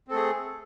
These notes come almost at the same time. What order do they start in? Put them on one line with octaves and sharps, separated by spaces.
C4 A4 A3 G#4